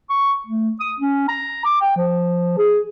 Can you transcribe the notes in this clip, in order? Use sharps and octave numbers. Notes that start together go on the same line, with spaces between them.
C#6
A3
D#6
C#4
A#5
D6
G5
F3
G#4